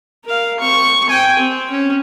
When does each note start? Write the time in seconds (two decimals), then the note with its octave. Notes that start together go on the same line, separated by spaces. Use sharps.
0.25 A#4 F5
0.59 C4 C#6
1.10 G5 G#5
1.39 C4
1.70 C#4